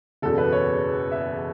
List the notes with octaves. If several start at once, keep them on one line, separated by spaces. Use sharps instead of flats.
F#1 E2 B2 A4
B4
C#5
E5